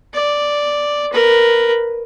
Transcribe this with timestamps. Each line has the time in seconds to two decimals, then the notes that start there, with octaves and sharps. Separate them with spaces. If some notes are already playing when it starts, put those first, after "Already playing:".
0.14 D5
1.12 A#4 B4